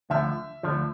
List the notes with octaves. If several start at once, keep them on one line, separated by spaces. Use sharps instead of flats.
D2 D3 F3 E5
D2 D3 F3